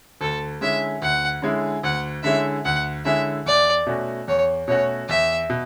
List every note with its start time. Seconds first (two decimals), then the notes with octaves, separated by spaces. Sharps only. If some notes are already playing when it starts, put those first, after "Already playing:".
0.21 D2 A4
0.61 D3 G#3 C#4 E4 E5
1.02 D2 F#5
1.42 D3 G#3 C#4 E4
1.83 D2 F#5
2.23 D3 G#3 C#4 E4 E5
2.65 D2 F#5
3.05 D3 G#3 C#4 E4 E5
3.46 E2 D5
3.87 B2 A3 C#4 F#4
4.28 E2 C#5
4.68 B2 A3 C#4 F#4 C#5
5.09 E2 E5
5.50 B2